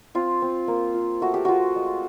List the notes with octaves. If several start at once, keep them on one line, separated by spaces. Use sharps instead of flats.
C4 F4
C4
A#3
F4
A3 F#4
G4
F4 F#4
G#3